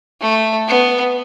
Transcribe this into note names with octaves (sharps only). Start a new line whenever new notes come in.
A3
B3